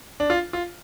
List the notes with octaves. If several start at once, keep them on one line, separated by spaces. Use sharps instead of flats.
D4
F4
F4